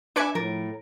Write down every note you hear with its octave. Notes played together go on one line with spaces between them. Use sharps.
D4 B4 E5 G#5 D6 C#7
A2 F3 A#4 A6